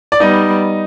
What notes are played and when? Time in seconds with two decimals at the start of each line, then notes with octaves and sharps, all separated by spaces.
0.12 D5
0.20 G3 B3 D#4 D#5